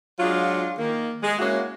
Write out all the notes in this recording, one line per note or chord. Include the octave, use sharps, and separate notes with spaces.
F#3 G#3 D4 F4
D#3 A#3
G#3
G#3 A#3 C#4 E4 F#4